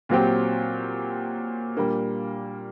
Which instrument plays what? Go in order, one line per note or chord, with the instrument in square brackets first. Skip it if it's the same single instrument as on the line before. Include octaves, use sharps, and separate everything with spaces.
[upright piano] A#2 F#3 C4 G4
A#2 G3 A#3 D4